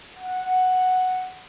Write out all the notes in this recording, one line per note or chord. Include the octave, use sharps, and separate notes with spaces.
F#5